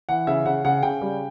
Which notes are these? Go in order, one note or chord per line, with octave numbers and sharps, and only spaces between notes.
E3 F#5
C#3 E5
C#3 F#5
C#3 F#5
C#3 G5
G3